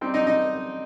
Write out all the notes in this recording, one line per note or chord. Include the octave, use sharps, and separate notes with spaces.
G3 C4 D#4
D#4 D#5
D#4 D#5